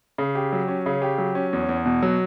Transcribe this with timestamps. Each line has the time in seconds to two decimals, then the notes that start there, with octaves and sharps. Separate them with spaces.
0.18 C#3
0.35 G4
0.52 F#3
0.68 C#4
0.86 C#3
1.02 G4
1.18 F#3
1.35 C#4
1.53 E2
1.69 E2
1.85 B2
2.03 F#3